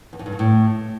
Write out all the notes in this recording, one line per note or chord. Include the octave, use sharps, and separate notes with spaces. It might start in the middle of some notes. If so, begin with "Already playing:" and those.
E2
F2
G2
C#3
A2